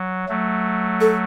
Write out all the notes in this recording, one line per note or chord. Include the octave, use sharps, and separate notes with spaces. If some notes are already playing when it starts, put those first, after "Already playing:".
Already playing: F#3
F#3 A3
A4